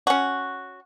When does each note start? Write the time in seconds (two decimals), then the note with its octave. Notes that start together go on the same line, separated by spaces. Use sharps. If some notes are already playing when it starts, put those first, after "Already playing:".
0.07 C#4 F#4